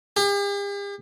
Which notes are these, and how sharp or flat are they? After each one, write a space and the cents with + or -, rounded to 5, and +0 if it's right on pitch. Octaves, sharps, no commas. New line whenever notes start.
G4 +45